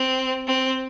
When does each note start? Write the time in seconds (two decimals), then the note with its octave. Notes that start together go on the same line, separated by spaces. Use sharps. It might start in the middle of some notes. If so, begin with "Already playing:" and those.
Already playing: C4
0.47 C4